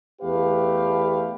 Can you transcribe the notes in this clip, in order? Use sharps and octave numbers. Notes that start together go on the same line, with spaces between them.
E2 A3 G4 B4 F5